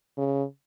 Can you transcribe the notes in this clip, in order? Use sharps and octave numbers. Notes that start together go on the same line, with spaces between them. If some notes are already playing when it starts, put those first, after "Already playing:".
C#3